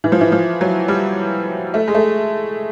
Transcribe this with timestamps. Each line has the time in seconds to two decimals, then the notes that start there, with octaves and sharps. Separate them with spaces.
0.04 E3
0.12 F3
0.21 E3
0.32 F3
0.61 F#3
0.88 G3
1.74 A3
1.88 G#3
1.95 A3